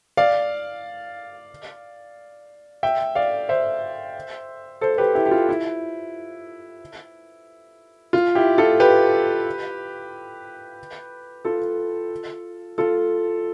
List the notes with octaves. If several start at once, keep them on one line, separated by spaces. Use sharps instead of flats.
D5 F5
E5 G5
D5 F5
C5 E5
A4 C5
G4 B4
E4 G4
G4
F4
E4
F4
E4 G4
F4 A4
G4 B4
F4 A4
F4 A4